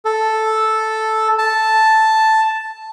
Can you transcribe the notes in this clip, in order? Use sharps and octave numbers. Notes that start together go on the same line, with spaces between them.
A4
A5